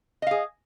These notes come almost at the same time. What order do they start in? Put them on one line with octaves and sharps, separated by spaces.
D#5 F5 G#4